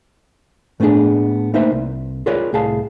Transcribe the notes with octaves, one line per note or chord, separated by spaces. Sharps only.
A2 A3 B3 C4 D4 G#4
A3 A#3 D#4 B4 C5 E5
C2
F4 G#4 A#4 B4 C#5 D5
C2 A2 G#4 F5 A5